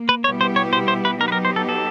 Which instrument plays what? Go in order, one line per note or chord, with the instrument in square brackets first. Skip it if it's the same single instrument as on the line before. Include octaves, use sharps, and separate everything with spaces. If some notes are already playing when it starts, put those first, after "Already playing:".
Already playing: [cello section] A#3
[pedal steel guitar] B4
[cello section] B2 G3 B3 E4 G4 [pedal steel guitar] C#5
[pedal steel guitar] C5
C#5
C5
C5
B4
[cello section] F#3 B3 D#4 G4 [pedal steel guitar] A#4
[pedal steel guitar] B4
A#4
C5
A4
A4